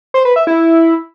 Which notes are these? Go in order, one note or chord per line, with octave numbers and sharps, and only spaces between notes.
C5
B4
E5
E4